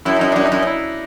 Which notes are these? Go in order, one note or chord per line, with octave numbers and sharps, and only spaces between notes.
F#2 E4
F#2 D#4
F#2 D4
D#4
F#2
E4